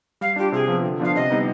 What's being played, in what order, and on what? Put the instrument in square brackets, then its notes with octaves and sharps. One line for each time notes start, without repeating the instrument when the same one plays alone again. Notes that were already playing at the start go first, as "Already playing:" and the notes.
[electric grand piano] G3 [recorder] F5
[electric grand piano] D4 F4 [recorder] G4
[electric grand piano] C3 [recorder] G#4
[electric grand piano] F3 B3
D3
[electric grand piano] F3 B3 D4 F4 [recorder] F5
[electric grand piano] C3 [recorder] D#5
[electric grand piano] G3 B3 D#4